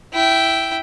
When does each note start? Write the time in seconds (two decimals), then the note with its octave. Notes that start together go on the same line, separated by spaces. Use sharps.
0.13 E4 G5